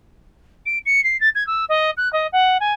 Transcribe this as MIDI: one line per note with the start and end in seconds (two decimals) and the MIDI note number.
0.66 0.78 98
0.85 1.03 97
1.03 1.19 96
1.20 1.29 93
1.35 1.46 92
1.46 1.65 88
1.69 1.90 75
1.97 2.11 90
2.12 2.27 75
2.32 2.57 78
2.60 2.73 80